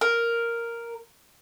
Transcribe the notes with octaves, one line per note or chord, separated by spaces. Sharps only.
A#4